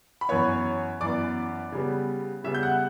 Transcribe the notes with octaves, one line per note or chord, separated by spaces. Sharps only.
B5
F#2 E3 B3 C#5 C#6
F#2 E3 B3 D5 D6
C#3 G3 B3
C#3 G3 B3 E5 E6
G6
F#5 F#6